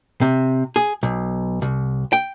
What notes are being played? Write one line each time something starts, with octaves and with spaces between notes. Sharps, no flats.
C3
G#4
B1
C2
G5